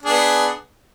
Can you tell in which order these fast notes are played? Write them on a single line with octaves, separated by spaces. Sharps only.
D4 G#4 B3